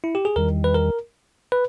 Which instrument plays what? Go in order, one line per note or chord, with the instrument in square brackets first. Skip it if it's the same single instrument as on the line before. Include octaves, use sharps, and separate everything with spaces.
[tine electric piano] E4
G4
G#4
[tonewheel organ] E2 D#3 G3 [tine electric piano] A#4
[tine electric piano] B4
A#4
B4